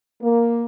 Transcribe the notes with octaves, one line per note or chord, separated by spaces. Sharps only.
A#3